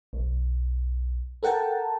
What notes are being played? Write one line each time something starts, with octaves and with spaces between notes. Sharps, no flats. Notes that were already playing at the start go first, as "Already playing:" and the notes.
B1
A4 A#4 F#5 G5 A5